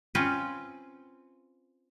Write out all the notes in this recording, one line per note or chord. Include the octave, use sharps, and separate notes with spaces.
C4 C#4 F4 B4